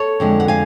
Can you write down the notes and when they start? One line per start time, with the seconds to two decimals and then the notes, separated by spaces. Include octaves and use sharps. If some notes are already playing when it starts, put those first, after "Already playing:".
Already playing: A4 C#5
0.20 F2 D3 G#3
0.40 F#5
0.48 F5 G#5